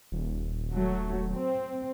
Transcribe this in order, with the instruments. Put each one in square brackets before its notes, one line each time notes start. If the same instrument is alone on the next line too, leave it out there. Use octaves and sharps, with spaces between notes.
[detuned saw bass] D#1
[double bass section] F#3 A3
C4